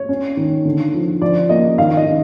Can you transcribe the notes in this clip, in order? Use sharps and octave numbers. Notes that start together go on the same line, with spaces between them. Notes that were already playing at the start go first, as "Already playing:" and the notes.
Already playing: C#5
C#4
D#3
D3
F3
F3 D5
A#3 D#5
D#3 F5
D#5
D#3